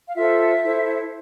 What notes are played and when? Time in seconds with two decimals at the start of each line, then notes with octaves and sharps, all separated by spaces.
0.08 F5
0.15 F4 A4 C5 E5
0.62 E4 A4 C5